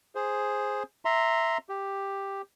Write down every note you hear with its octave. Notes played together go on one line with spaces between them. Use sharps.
G#4 C5
E5 A#5 C6
G4